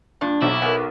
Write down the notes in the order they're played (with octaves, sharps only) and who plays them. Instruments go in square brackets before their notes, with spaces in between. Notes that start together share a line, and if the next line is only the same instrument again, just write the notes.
[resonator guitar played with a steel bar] G2 D4 [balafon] A#3 F4
[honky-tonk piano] B1 [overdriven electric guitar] E4 [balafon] C5 F#5 A#5
[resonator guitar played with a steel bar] B3 [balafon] A#4 F#5 G#5